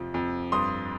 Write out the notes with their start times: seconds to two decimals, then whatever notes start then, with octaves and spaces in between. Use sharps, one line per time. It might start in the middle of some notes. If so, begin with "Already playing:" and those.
Already playing: F2 C3 F3
0.14 F2
0.52 G2 C6 D#6